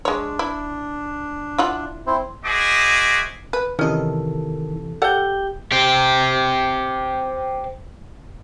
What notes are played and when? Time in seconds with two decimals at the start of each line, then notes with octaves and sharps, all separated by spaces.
0.05 G#3 D4 C#5
0.39 E4
1.58 E4 F4 F#5
2.07 C4 E4 C5
2.45 F#4 G#4 C5 D#5 E5 D6
3.53 B4
3.79 C3 D#3 E3 C#4 A4 D#5
5.02 G4 A4 D5 F#5 G6
5.72 C4 G4